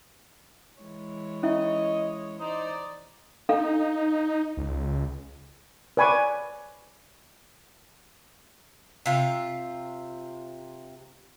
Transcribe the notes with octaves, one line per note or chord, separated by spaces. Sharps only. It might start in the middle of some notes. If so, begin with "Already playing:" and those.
E3 G#3 C#5
C#4 E4 D#5 E5
D#4 C5 D5
D4 D#4 A4 F5
C#2
B4 D5 G#5 B5 C#6 D6
C3 F4